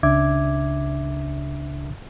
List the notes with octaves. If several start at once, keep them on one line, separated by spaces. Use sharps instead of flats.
C#2 C#3 D4 E5 D6 G#6